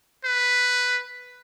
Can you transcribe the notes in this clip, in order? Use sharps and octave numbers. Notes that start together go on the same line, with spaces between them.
B4